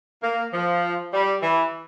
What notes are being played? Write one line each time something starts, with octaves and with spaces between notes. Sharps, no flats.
A#3
F3
G3
E3